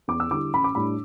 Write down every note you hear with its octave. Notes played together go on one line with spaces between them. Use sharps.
E2 D6
E6
D3 G3 E4 D6
A1 B5
D6
A2 G3 D4 B5